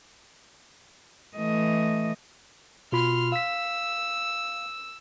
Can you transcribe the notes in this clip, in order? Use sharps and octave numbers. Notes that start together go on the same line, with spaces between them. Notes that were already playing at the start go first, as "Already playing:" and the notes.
E3 A3 D#5
B2 F4 B5 C6 F6
F5 E6 B6